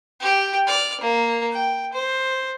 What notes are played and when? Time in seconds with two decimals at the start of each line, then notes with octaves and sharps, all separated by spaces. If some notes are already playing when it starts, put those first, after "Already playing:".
0.21 G4 G5
0.67 D5 F6
1.01 A#3
1.52 G5
1.93 C5